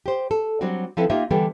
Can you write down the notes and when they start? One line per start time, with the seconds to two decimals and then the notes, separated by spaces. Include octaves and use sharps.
0.06 G4 C5
0.31 A4
0.61 F#3 G3 C4 D4 F#4
0.97 F3 C4 E4 A4 B4
1.10 A#3 D#4 F4 G4 D#5 E5
1.30 D3 E3 G3 B3 G4 A4